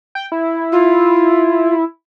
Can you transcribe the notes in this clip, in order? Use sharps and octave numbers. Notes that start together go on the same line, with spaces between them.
G5
E4
F4